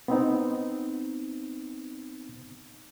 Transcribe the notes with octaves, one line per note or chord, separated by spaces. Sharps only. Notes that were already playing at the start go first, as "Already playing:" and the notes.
B3 C4 D#4